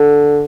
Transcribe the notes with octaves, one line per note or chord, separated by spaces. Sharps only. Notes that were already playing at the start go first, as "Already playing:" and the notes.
Already playing: D3